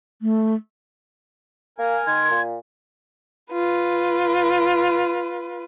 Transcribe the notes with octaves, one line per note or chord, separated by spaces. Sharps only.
A3
A#3 A#4 G#5
D#3 C6 G#6
A#2
F4 B4